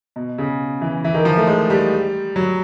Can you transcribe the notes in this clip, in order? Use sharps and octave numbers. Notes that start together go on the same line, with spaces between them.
B2
C#3
E3
E3
D#3
F3
A3
G#3
G3
F#3